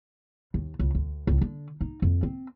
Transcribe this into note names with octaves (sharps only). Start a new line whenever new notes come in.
D#2
C#2
D2
C#2
D3
D#4
F2
C4